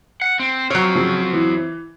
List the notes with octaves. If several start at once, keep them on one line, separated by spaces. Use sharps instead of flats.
F#5
C4
F#3 C4 F4 C#5
C#3 F3
E3